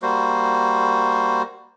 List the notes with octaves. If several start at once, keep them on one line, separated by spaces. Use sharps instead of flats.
G3 A#3 F#4 C5